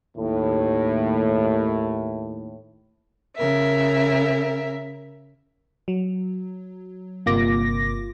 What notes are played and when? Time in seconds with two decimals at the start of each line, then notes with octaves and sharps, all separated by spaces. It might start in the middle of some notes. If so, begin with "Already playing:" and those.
0.17 D#2 A2
3.36 C#3 A#4 E5
5.88 F#3
7.26 G1 C3 A#3 F4 D6 A#6